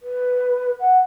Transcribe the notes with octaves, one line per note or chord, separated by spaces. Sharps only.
B4
F#5